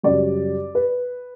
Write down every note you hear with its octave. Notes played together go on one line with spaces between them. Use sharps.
F#2 C#3 G3 D5
B4